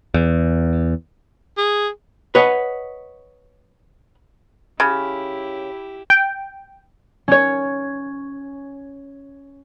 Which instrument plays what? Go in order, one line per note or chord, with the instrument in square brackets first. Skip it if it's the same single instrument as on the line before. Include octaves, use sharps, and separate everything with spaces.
[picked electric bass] E2
[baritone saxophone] G#4
[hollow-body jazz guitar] B4 C#5 D#5 F#5
[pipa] C#3 [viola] E4 G4 [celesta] B5
[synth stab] G5
[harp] C#4 C#5